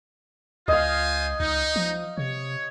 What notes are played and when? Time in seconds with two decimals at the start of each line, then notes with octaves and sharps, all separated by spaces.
0.68 C#2 F4 C5 D#5 F5 G#5
1.40 C#2 D#4
1.76 F3
2.18 C3 C#5